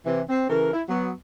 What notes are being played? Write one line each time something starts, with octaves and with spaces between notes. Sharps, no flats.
C3 E3
C4
C#3 E3 A4 A#4
E4
F#3 B3